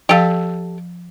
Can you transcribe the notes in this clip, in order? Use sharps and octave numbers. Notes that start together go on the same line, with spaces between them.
F3 G4 A4 F5